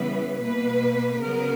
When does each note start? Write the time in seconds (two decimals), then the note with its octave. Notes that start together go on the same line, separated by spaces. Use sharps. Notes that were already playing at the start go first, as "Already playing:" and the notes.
Already playing: C#3 E3 G3 B3 B4
0.41 B2 A#3 B4
1.22 C#3 F#3 B3 A#4